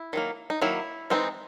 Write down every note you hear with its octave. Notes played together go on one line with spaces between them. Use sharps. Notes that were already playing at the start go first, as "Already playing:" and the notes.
Already playing: E4
D#3 F#3 A#3
D#4
D#3 F#3 A#3 E4
E3 G#3 C4 D#4